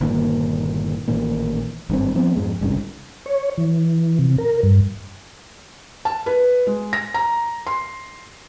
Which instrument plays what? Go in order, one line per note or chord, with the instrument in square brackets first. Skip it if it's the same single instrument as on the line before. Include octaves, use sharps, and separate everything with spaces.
[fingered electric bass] G1 A#2 D#3 A#3
A1 A#2 D#3 A#3
G#1 G2 D3 C4
F3 B3 C4
F2 G#2 G#3
G1 C2 G#2 C#3
[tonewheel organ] C#5
E3
C3
A#4
G2
[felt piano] A5
B4
G#3
A#6
A#5
C6